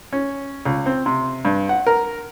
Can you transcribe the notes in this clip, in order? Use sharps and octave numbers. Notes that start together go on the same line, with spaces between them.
C#4
C#2
C4
C3
G2
F#5
A#4